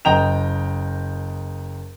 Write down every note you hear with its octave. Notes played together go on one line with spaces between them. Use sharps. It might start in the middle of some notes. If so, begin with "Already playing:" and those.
F#1 D#5 G5 A#5 F7